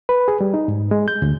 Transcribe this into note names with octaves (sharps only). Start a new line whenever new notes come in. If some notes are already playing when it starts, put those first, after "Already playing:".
B4
G#4
G3
D#4
G#2
G#3
G6
D2